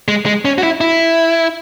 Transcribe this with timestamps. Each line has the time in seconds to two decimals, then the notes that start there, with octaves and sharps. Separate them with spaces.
0.08 G#3
0.26 G#3
0.45 C#4
0.58 F#4
0.63 E4
0.81 E4